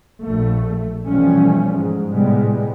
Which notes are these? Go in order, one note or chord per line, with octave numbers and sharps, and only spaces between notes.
A#1 A3
B2 E3 F3 G3 A3 C#4
G#2
A2 C3 G3 G#3 B3